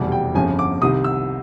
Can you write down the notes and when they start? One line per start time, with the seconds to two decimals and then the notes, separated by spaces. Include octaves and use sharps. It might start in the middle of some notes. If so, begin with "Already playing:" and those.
Already playing: F1 E2 B2 G3
0.12 G5
0.34 G1 F2 C#3 F3 G#5
0.59 D6
0.81 C2 C3 D#3 D#6
1.04 E6